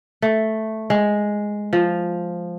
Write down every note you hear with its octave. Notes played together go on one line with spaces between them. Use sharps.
A3
G#3
F3